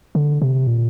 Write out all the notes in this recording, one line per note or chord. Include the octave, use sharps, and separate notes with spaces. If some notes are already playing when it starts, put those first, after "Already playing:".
D3
C3
A#2